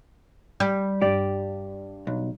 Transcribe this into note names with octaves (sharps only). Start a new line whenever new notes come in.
G3
G2 G4 D5
B1